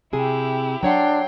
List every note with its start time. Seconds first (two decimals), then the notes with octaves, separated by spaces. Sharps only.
0.13 C3 E4 G4 G#4
0.83 F#3 D4 C#5 F#5 G5 C6